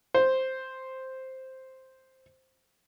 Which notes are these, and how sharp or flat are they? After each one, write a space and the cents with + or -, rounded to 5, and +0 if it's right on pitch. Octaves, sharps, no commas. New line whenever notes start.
C5 +0